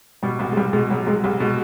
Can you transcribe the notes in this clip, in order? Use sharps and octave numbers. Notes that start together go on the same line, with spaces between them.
B2 G3
C2 G3
G#3
C2 G3
B2 G#3
F#3 G3
C2 G#3
C2 G3
B2 G#3